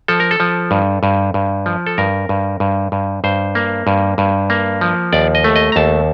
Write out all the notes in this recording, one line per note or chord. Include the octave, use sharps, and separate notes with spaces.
F3 A4
A#4
A4
F3
G2
G2
G2
F3
A4
G2 A#4
G2
G2
G2
G2 C5
A#3
G2
G2
A#3
F3
D#2 D5
D#5
A3
D#5
A#5
D#2 A5